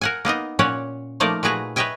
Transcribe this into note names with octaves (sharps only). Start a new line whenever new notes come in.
A#4 F#5 G#5
A#3 B3 D#4 D#5
A#2 C#4 C#5 D5 F#5
F3 A3 A#3 D#4 A#4 D5
A#2 A3 F#4 G#4 B4 A#5
B4 C#5 D#5 E5 G5 G#5